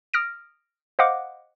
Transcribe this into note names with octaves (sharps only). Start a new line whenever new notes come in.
D#6 F6 A#6 D7
C5 D#5 F5 F#5 D6